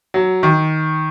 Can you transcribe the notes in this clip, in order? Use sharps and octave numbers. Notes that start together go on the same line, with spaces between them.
F#3
D#3